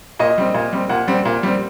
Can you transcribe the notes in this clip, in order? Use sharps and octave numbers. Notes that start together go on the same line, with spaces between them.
A#2 D#5
G3 C4
A#2
G3 C4
A#2 F#5
G3 C4
A#2
G3 C4